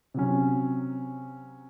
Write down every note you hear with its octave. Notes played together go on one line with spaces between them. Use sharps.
C3 F#3 C#4